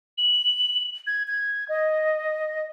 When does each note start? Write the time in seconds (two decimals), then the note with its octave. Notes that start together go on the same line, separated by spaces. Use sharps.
0.18 F#7
1.07 G#6
1.27 G#6
1.69 D#5